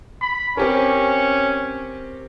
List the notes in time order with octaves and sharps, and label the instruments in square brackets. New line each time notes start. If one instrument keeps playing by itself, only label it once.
[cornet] B5
[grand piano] C4 G4 A#4 [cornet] C#4